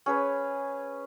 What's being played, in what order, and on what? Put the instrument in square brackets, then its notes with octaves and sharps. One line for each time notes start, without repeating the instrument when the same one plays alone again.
[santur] C#4 G#4 B4